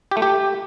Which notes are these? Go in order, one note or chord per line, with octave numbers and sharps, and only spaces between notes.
G4
A3
G4